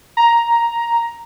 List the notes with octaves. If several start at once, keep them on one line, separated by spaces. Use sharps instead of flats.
A#5